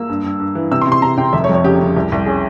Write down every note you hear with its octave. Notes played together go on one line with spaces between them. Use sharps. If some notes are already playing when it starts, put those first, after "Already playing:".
Already playing: A#3 E6
G2
G2
G2
E3
C3 E6
C6
C3
C6
C3 A#5
C3 G5
F1 E5
C#5
F2
C#5
C#3 G4
C#3
C2
C2
C#4 G#4